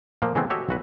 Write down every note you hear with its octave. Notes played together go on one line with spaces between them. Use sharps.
A#2 F3 A3 A#3
C#3 E3 G#3 A3 B3 C4
F#4 G4 A4 C#5 D#5 E5
B1 F#4 B4